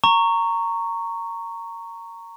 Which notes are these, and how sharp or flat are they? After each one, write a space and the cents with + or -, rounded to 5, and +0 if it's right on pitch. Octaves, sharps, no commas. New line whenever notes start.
A#5 -15 C#6 +0